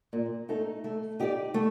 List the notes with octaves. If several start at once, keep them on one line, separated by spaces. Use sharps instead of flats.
A#2
A3 D#4 A4
A3
D#4 G4 D5
A3